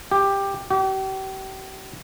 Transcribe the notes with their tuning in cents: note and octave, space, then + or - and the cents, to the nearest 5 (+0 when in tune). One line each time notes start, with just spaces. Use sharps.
G4 +10
G4 -40